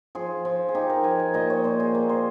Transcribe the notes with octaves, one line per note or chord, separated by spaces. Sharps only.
F3 G#4
F3
G#4
D#4 G4
A#4
F3 G#5
G#5
A#2 D#5
C#5
A#2 C5
G#4
A#3
C5